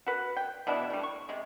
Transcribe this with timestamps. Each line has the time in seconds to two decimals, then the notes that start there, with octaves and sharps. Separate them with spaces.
0.07 F#4 B4
0.37 G5
0.67 B2 E3 D4 E4
0.90 G3 A3
1.03 C#6
1.29 C3 G#3